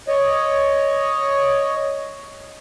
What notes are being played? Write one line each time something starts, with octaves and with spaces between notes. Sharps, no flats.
C#5 D#5